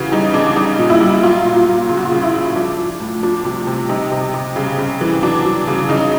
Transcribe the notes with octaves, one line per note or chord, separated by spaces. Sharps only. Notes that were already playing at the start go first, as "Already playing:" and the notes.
Already playing: C#3 E3 F#4
G3 D#4
C#3 D4
G3 D#4
A#2
E4
G3
F#3 F4
A#2
A#2
C#3 F4
F#4
F4
C#3
E4
F#3
F3 D4
F3
A2
F3 D4
C3
C3
C3 D#4
C3
C3
C#3
C#3
E3
F#3 D4
F#3
C#3
C#3 D#4